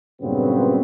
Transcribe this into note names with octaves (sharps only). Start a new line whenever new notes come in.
G2 A#2 C#3 F#3 B3 C4